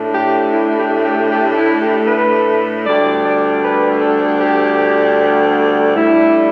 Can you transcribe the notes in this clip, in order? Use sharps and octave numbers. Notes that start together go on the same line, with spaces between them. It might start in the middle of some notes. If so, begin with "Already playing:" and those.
Already playing: A2 A3 D4
G4
E4
G4
G4
G4
E4
G4
B4
D2 D3 G3 D4 D5
D5
B4
A4
G4
A2 G3 D4 E4